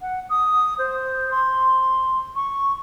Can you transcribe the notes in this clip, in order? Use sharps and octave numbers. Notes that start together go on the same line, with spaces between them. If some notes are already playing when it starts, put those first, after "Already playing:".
F#5
D#6
C5
C6
C#6